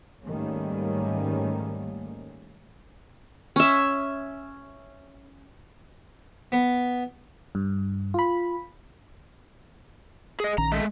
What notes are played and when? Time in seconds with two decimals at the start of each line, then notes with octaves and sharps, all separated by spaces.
0.24 G#2 D#3 G3 A3 A#3 C#4
3.56 C#4 E5
6.52 B3
7.55 G2
8.14 F4 B5
10.40 G#4 D#5
10.58 A#1 D#3 C#4 A#5
10.72 G#3 A3